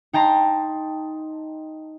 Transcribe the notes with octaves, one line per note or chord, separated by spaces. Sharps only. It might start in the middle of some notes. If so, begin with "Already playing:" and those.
D#4 G5 A5 A#5 C6